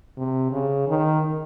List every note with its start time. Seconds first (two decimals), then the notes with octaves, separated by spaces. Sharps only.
0.17 C3
0.52 C#3
0.88 D#3